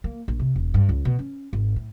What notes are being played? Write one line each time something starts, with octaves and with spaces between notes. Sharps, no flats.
A#3
A#1
C3
E1
G2
C#2
B2
C#4
G#1
A2